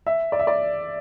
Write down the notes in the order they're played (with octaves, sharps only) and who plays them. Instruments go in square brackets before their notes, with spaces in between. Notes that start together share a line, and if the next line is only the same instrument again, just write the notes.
[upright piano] E5
D5
E5
D5